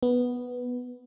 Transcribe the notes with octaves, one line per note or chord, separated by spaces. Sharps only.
B3